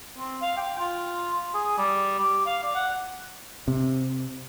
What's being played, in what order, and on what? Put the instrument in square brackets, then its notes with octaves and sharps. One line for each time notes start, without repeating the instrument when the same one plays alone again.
[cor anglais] C4
F5
G5
F4
G#4
G3
G4
F5
D5
F#5
[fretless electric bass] C3